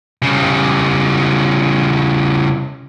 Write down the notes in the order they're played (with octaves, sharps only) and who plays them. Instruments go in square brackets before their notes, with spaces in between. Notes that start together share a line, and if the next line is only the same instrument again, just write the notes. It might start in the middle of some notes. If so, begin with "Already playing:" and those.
[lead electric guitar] C#3 G3